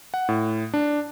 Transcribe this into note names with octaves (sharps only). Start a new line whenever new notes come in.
F#5
A2
D4